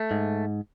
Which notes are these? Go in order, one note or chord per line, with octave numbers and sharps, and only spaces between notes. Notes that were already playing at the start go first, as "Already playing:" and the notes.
Already playing: A3
G#2